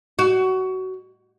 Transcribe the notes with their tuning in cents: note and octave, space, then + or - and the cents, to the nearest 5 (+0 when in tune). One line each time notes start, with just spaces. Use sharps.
F#4 +20